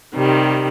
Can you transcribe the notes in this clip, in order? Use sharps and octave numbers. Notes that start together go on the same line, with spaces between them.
C3 D#3 G3